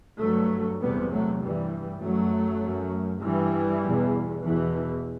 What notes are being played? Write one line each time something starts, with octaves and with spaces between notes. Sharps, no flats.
G2 F#3 A3
E2 C3 G3 B3
F#3 A3
G2 E3 G3
F#2 F#3 A3
F#2
G2 E3 G3
E2 B2
E2 B2 E3